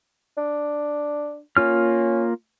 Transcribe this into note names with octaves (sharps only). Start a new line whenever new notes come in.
D4
A#3 C#4 F4 F6